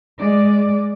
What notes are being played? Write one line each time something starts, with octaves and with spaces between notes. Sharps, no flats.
G#3 D5